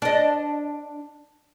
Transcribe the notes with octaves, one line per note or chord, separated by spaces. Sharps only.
D4 D#5